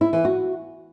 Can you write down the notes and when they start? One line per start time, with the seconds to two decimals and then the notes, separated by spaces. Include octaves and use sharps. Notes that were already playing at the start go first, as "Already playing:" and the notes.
0.01 E4
0.13 E3
0.25 F#4